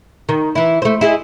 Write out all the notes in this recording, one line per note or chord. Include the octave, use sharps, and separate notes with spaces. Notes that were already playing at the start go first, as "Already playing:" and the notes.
D#3
E3 E4
A3 C5
E4 G#4 D#5